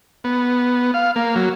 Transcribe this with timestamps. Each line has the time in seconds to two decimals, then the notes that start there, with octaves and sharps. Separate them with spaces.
0.24 B3
0.94 F5
1.16 A#3
1.36 F#3